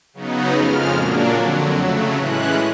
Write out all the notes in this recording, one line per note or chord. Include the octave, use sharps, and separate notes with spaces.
C#3 F#3 B3 D#4
F2 C#3 F3 G#3 F6
A#2 F#3 A#3 D4
F2 D3 F#3
C#3 F#3 A3 E6
A2 E3 G#3 C#4 F#6